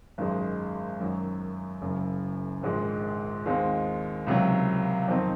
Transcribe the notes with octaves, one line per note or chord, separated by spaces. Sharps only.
G#1 F#2 D#3 G#3
F#2 D#3 F#3
F#1 F#2 C#3
A#1 G#2 D#3 G#3
D#2 D#3 G#3 C4
C#2 C3 D#3 F#3
F2 D#3 F#3 C4 D#4